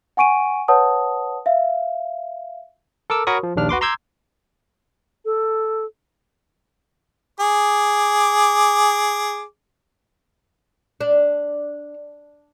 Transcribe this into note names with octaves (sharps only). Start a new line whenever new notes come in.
F#5 G#5 C#6 D7 D#7
B4 C#5 F#5 A5 D#6
E5 F5
A4 A#4 D6 E6
F#4 A#4 C#5 B5 C#6 D#6
F3
A#1 D#2 D4 F6
F#4 B4 C6 D6
A#5 C6 D6 E6 G6 G#6
A4
G#4 D6
D4